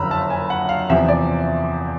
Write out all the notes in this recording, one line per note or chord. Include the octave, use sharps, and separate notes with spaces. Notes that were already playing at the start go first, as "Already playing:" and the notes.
Already playing: F#1 F2 D3 F3 A#5 B5 E6 F6
A5
G#5
F#5
F5
E2 C3 F3 E5
D5